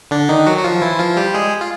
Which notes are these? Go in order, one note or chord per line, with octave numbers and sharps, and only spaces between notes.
D3 D4
D#3 D#4
F#3 F#4
F#4
F3 F4
E3 E4
F3 F4
G3 G4
G#3 G#4
F4